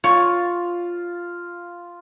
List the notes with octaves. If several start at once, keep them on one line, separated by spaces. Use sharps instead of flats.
F4 C#5